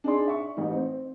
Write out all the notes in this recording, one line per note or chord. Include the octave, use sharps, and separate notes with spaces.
D4 D#4 G#4 D5 C6
E5 C#6
A1 D#4
C4